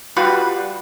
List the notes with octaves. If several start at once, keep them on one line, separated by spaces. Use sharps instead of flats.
G3 F4 F#4 B4